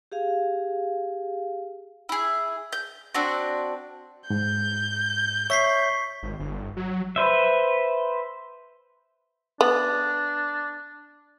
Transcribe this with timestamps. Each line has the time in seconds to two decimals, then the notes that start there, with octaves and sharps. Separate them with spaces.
0.12 G4 G#4 F5
2.09 E4 G#4
2.72 G6
3.15 C4 D4 F#4
4.30 G#2 G6
5.50 C#5 E5 C#6 B6 C7
6.23 G#1
6.39 G1
6.77 F#3
7.16 B4 C5 E5
9.61 B3 D4